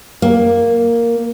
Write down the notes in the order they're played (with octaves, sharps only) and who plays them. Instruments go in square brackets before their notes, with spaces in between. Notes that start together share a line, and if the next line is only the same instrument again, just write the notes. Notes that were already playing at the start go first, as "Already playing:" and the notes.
[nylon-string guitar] A#3